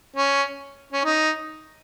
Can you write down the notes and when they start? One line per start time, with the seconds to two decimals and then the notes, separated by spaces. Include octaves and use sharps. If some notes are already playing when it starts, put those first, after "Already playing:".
0.16 C#4
0.93 C#4
1.04 D#4